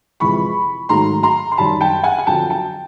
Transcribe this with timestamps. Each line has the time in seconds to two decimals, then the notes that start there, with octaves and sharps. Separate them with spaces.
0.20 F2 C3 E3 G#3 B5 C#6
0.89 G#2 D#3 F#3 A3 A#5 C6
1.23 A#5 C6
1.52 C6
1.57 F#2 D#3 G3 A5 B5
1.81 G5 A5
2.03 F#5 G#5
2.18 G#5
2.27 F2 D3 F#3 G5 A5
2.50 G5 A5